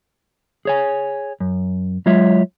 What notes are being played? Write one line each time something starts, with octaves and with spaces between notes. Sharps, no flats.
G#4 C#5 G#5
F#2
F#3 G#3 F4 C#5 E5